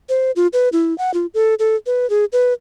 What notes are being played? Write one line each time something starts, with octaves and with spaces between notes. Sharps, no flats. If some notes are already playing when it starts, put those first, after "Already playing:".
C5
F4
B4
E4
F#5
F4
A4
A4
B4
G#4
B4